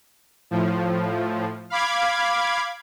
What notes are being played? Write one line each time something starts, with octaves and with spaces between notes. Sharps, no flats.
A2 F3
F5 B5 D6 G#6